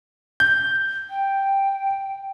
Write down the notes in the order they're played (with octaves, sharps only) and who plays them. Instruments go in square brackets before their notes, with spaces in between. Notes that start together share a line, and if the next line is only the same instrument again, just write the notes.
[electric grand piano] G6
[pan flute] G5